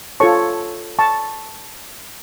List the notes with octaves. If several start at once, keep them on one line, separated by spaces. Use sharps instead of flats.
F4 A4 C#5 A5 C#6
A5 C#6